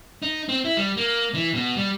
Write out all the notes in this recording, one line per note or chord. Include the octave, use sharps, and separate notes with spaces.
D#4
C4
E4
G3
A#3
E3
B2
G3